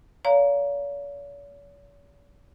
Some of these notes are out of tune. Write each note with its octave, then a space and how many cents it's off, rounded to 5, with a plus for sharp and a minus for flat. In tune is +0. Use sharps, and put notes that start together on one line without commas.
C#5 +45 F5 +0 A#5 +0